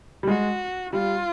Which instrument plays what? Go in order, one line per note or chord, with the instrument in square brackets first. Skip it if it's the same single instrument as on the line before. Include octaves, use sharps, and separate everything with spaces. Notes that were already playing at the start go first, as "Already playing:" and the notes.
[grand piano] G3
[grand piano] G#3 [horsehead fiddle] F#4
[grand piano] G3 [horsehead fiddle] F4